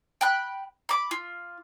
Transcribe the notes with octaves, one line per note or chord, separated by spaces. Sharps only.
G5 B5 F#6
B5 D6
F4